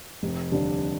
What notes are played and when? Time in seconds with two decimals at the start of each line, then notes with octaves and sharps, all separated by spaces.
0.23 F1
0.51 D#2 D3 G3 D4